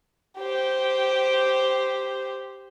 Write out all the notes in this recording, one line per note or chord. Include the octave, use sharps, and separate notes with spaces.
G4 C5